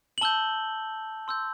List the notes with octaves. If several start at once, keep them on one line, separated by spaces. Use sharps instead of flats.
F#7
A5 E6 G6 G7
C6 E6 G6